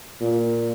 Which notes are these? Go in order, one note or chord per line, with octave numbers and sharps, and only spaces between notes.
A#2